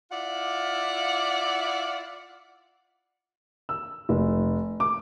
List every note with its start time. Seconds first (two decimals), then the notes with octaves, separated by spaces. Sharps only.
0.12 E4 F4 D5 F5 F#5
3.69 E6
4.09 F1
4.80 D6